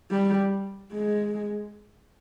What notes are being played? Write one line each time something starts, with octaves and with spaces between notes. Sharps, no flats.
G3
G#3